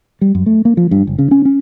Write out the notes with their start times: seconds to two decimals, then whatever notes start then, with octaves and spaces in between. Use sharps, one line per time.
0.21 G3
0.35 F#2
0.46 A3
0.65 A#3
0.77 F3
0.91 G2
1.07 F#1
1.19 C#3
1.31 C#4
1.45 C#4